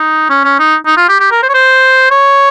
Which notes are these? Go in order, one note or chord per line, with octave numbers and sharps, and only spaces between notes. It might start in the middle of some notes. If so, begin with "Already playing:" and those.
Already playing: D#4
C#4
C#4
D#4
D#4
F4
G4
G4
A#4
C5
C#5
C5
C#5